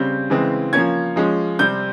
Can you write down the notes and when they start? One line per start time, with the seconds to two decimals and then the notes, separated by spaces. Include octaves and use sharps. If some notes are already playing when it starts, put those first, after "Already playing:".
Already playing: C#3 G3 C4 G6
0.30 C#3 E3 G#3 C4
0.73 F3 A#3 C#4 G#6
1.16 F3 G#3 C#4
1.59 C3 G3 C4 G6